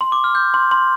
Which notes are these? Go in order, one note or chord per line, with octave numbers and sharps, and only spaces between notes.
C6
D6
F6
G6
C6
C6